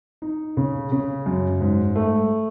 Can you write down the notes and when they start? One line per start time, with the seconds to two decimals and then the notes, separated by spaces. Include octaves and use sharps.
0.22 D#4
0.57 C#3
0.92 C#3
1.26 F#2
1.61 G#2
1.96 A3